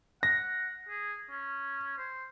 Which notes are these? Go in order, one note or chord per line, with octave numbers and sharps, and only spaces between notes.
F#5 A#6
G#4
C#4
C5